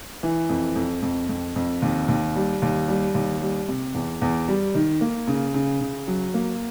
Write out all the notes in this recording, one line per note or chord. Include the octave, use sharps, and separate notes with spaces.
E3
F2
F2
F2
F2
F2
D#2
D#2
G3
D#2
G3
D#2
G3
C3
E2
E2
G3
D#3
A#3
C#3
C#3
C#3
F#3
A#3